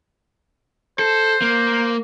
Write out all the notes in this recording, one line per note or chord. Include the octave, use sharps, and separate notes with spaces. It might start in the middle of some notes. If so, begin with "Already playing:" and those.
A4 C5
A#3